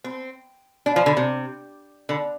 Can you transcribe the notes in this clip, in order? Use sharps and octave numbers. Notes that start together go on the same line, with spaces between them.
C4
D4
F3
D3
C3
D3